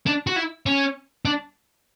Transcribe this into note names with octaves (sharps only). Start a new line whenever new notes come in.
D4
F#4
E4
C#4
D4